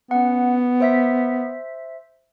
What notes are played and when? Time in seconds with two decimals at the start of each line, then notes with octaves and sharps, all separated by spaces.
0.11 B3 C#4 F#5
0.80 C5 E5 B6